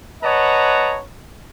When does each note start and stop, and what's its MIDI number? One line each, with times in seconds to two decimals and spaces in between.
0.23 1.00 71
0.23 1.00 73
0.23 1.00 75
0.23 1.00 78
0.23 1.00 81
0.23 1.00 82